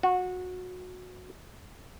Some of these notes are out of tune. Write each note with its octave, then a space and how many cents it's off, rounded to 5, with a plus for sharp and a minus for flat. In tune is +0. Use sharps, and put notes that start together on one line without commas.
F#4 -20